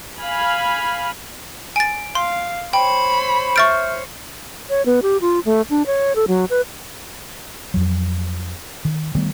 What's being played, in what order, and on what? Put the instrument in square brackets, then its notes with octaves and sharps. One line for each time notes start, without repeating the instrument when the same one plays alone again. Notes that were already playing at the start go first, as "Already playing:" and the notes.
[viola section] F5 G#5 B5
[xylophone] G#5 A6 [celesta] D7
[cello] F5 [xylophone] C6
[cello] C5 C#5 [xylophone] G5 [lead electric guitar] B5
[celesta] E5 F6 G6 [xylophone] C#6 A6 D7
[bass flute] C#5
B3
G4
F4
A3
D4
C#5
A4
F#3
B4
[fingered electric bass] F2 F#3
D#3
D#3 G3 A3 B3